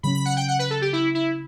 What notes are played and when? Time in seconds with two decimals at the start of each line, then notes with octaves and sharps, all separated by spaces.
0.03 C#3 F#3 C#4 B5
0.15 B5
0.25 F#5
0.37 G5
0.48 F#5
0.59 B4
0.70 A4
0.82 G4
0.93 E4
1.15 E4